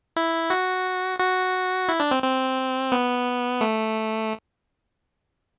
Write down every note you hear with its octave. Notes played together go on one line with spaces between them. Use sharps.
E4
F#4
F#4
E4
D4
C4
C4
B3
A3